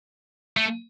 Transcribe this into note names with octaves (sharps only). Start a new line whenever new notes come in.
A3